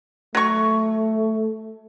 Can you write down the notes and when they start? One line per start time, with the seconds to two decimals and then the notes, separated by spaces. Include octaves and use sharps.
0.35 F#3 A3 C#6